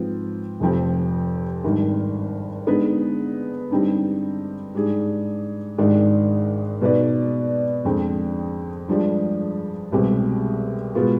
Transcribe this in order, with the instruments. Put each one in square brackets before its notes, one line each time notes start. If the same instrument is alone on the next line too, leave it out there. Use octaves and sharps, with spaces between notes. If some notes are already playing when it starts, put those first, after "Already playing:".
Already playing: [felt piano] G#2 F3 C4 F4 B4
F1 F2 C3 F3 C4
G#1 G2 D#3
D3 G#3 B3 D#4 B4
G2 D3 G3 C4 D#4
G#2 G3 D4 G#4
G#1 G#2 D#3 G#3 D4
B2 B3 D#4 B4 D5
F2 D3 G#3 C4
G2 F3 G#3 D4
C2 B2 G#3 C4 G4
B2 G#3 B3 F4